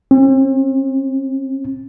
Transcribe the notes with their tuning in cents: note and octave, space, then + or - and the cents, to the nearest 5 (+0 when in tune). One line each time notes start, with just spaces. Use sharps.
C4 +45